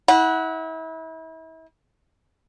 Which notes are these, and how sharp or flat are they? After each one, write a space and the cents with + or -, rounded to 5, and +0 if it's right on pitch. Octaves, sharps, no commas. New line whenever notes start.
E4 -35 F#5 +0